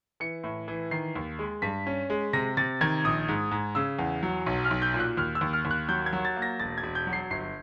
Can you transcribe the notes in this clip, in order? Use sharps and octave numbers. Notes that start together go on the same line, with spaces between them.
E3 C#7
A2
E3
D#3 C7
D#2
G#3
G2 B6
C#4
G#3
C3 A#6
C3 A6
D#3 G#6
A#1 D#6
G#2
G#2
C#3 E6
E2
F#3
B1
F6
B1
G6
A#2
F#6
D#2 F6
E6
D#2
F6
D#2
F#6
F#3 G6
G#6
F#3
A6
A#3
A#6
E1 A6
G#6
E1
G6
F#3
C7
G1 C7